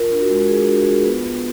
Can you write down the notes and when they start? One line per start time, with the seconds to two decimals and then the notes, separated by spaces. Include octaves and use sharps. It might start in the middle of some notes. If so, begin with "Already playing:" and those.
Already playing: F4 A#4
0.11 D4
0.20 F#4
0.29 G#3
0.48 F4 G#4
0.68 D4 F#4
0.87 F4 G#4
1.05 B3 B4
1.24 B3